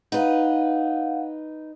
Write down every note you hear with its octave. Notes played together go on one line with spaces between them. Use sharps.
D#4 B4 F5 F#5